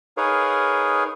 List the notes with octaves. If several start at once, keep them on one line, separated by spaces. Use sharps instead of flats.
D#4 G#4 A#4 B4 C#5 F5